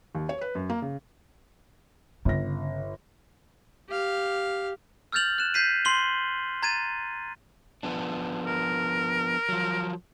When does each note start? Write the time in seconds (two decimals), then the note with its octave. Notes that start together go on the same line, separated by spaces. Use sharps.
0.15 D#2
0.29 C#5
0.41 B4
0.55 F#2
0.70 A#3
0.82 C#3
2.25 G1 C#3 A#6
3.89 G4 F5
5.12 E6 F6 G6 A6 F7 F#7
5.38 F#6 E7
5.54 G6 B6 C7 D#7
5.85 C6 C7 F#7 G7
6.62 A#5 G#6 A6 D#7
7.83 F3 B3 D4
8.45 A#4
9.49 F3 F#3